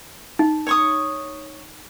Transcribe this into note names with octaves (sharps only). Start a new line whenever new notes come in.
D#4
C#5 C#6 D#6